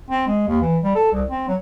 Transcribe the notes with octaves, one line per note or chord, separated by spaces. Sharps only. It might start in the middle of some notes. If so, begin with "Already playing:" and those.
C4
G#3
D#2
E3
G3
A4
C2
C4
F#3